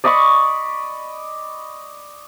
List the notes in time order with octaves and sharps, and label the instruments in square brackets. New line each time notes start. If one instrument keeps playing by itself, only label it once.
[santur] D5 D#5 B5 C#6